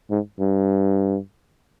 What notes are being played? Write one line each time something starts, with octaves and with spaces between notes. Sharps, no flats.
G#2
G2